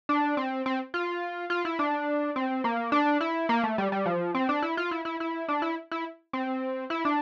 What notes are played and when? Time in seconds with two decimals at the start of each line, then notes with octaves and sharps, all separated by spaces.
0.09 D4
0.37 C4
0.66 C4
0.94 F4
1.50 F4
1.65 E4
1.79 D4
2.36 C4
2.64 A#3
2.92 D4
3.21 E4
3.49 A#3
3.64 A3
3.78 G3
3.92 G3
4.06 F3
4.35 C4
4.49 D4
4.62 E4
4.77 F4
4.91 E4
5.05 E4
5.20 E4
5.48 D4
5.62 E4
5.92 E4
6.33 C4
6.90 E4
7.05 D4